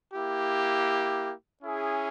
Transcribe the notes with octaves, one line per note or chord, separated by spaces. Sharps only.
A#3 E4 G4
C#4 E4 G#4